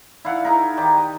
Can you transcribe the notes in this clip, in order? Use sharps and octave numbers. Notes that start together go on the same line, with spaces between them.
E4 D5 F5 F#5
D#4 E4 G#4 A#4
D#3 G4 D5
D#5